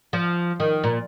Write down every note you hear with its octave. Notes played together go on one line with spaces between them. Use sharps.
F3
D#3
A#2